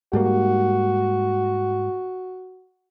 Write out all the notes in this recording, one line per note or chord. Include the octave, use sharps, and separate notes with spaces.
G#2 G3 A#3 F#4